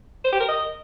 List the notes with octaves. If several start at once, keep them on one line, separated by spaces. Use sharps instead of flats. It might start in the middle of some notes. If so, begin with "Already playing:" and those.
C5
G4
A#4
D#5